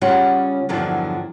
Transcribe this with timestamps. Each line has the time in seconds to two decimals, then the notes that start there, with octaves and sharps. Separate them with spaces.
0.01 C#3 G3 C#4 F4 F#5
0.69 E2 G2 D3 F3 F#3